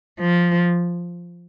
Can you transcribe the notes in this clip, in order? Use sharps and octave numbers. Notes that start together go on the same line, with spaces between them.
F3